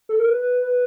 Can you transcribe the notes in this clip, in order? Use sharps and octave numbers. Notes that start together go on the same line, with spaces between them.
A4
A#4
B4